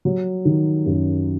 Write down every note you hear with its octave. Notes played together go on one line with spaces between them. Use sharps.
F#3
D#3
F#2